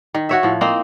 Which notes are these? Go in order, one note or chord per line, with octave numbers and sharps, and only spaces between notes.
D#3
F#4 C#5 E5
A2 F3
A#3 C4 D#4